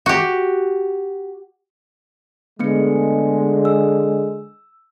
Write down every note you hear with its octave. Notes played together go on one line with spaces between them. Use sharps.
F#4 G4
D3 G#3 A3 B3 C#7
E6